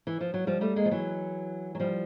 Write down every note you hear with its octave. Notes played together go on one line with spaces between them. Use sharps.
E3
F3
F#3
F3 G3
G3 A3
G#3 A#3
F3
E3 F#3
F#3
F3 G3